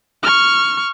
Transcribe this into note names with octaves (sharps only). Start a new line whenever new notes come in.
C#6 F6